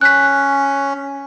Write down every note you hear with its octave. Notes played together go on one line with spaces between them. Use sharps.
C#4 F#6 B6